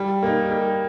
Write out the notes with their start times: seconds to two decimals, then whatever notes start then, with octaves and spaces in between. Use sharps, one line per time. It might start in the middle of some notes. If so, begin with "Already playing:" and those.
Already playing: G3
0.23 A#3 D#4
0.51 G3